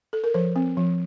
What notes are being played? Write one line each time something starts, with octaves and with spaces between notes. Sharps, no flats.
A4
A#4
F3 C5
C4
F3